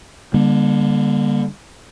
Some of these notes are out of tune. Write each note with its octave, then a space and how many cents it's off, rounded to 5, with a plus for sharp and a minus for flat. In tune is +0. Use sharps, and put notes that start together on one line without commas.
D3 +0 G3 +40 A#3 +40